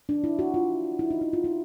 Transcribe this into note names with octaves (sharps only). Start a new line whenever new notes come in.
D4
E4
F#4
F4
E4
D#4
E4
F4
E4